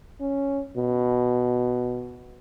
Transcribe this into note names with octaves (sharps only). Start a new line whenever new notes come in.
C#4
B2